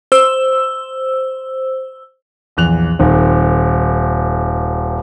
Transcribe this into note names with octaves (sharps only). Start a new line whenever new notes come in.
C5 E6
A#1 E2 F#6 F7
D#1 D#3 C4